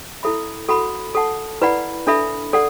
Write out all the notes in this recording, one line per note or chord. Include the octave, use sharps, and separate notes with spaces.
E4 A4 E5 B5
F#4 A4 F#5 B5
A4 F#5 A5
E4 B4 D5 F#5 B5
D4 A4 E5 B5
A4 D5 F#5